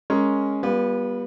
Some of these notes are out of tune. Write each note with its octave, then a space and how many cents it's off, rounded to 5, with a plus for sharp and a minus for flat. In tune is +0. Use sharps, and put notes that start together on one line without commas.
G#3 +0 C#4 +0 A#4 +0
G3 +20 B3 -25 F4 +0